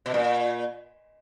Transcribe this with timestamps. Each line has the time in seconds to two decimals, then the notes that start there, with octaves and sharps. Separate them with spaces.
0.06 B2
0.14 A#2